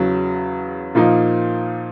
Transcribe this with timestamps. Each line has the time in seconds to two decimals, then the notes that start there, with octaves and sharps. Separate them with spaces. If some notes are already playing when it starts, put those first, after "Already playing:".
Already playing: E2 C#3 F#3
0.95 A#2 F3 A#3 D#4